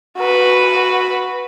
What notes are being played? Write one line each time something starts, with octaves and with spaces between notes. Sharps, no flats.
F#4 B4